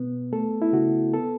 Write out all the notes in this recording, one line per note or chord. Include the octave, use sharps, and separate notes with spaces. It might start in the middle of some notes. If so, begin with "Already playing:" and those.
Already playing: B2 B3
A3 A4
E4
C#3 F#4
B3 A4